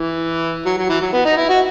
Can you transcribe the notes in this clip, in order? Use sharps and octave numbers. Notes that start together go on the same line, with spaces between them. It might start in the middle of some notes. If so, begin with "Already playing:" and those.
Already playing: E3
F#3
F#3
E3
F#3
B3
D#4
E4
F#4